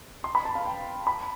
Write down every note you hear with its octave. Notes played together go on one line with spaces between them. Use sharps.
C6
B5
A5
F5
G5
B5